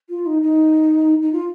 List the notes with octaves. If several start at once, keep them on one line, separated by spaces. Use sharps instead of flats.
F4
D#4
D#4
D#4
F4